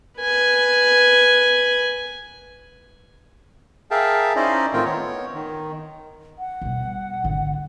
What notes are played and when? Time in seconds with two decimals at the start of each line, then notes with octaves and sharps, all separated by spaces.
0.19 B4 G#5
3.91 G#4 A#4 E5 F5 G5 A5
4.36 C#4 D#4 E4 C5 D5 D#5
4.73 A2 D#3 C4 F4 A#4 G5
4.85 B3 C#5
5.34 D#3
6.39 F#5
6.62 B2 G3
7.24 G#1 D3